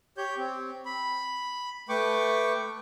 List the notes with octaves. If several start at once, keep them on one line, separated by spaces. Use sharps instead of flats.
G4 C#5 G6
C4
B5
A3 B4 G5 C#6 D6